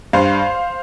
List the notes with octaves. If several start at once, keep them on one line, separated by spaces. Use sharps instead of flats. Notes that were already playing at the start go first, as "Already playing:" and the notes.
G2 C5 F5